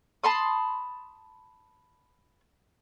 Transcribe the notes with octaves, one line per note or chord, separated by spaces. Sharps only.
A5 B5 C6 D#6